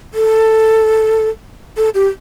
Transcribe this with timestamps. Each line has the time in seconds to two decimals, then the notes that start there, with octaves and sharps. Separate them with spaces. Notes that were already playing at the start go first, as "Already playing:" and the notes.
0.14 A4
1.77 A4
1.94 G4